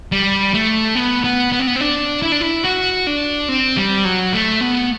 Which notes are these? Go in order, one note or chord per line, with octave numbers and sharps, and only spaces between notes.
G3
A3
B3
B3
B3
C4
B3
C4
D4
E4
D4
E4
F#4
D4
C4
G3
F#3
A3
B3